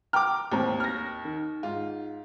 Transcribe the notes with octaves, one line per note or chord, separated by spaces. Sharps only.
G5 A#5 D6 F6
A1 D#2 C4 A#5
F6 A#6
D#3
G#2 F4